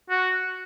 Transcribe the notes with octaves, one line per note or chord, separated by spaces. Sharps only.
F#4